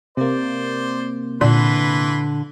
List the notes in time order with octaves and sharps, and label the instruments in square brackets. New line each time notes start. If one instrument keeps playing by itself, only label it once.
[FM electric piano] C3 A#3 [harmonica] C5 D5
[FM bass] A#2 [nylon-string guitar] D3 [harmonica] E3 B4 C6